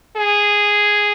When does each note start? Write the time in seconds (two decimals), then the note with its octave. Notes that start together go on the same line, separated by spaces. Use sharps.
0.17 G#4